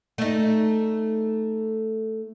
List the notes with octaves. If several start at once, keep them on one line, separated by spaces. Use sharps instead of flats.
A3 D#4